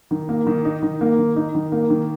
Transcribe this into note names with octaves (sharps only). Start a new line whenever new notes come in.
D#3
A#3
D#3
D#4
D#3
A#3
D#3
D#4
D#3
A#3
D#3